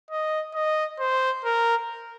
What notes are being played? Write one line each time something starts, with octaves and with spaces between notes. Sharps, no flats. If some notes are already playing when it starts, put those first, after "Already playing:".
D#5
D#5
C5
A#4